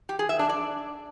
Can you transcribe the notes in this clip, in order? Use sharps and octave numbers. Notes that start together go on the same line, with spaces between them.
G4
G#4
E5
D4
D5